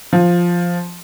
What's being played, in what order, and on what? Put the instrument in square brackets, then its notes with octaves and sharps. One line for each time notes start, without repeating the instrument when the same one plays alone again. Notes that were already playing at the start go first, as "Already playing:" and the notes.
[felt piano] F3